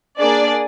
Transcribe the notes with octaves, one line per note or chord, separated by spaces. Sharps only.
A#3 D4 G#4 D5